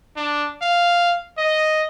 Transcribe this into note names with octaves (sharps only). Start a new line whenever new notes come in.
D4
F5
D#5